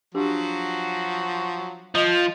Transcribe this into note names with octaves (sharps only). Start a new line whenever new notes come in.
F3 F#3 D4 F#4 G4
F3 D#5